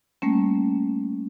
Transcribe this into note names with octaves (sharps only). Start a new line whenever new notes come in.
G3 A3 A#3 C#4